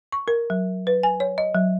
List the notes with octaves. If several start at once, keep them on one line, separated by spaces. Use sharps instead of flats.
C#6
A#4
F#3
B4
G#5
C#5
D#5
F#3